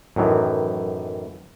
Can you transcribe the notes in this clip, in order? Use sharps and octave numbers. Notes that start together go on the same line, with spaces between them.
F#2 A2 D#3 E3